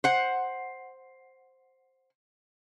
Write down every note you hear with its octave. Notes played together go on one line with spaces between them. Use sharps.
C5 F#5